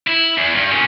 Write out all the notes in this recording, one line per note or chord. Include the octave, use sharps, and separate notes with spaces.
E4
E2
G2
A#2 C#4